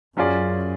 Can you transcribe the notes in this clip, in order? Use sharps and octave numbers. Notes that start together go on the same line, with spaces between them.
F#2 F#3 C#4 F4 G#4 D5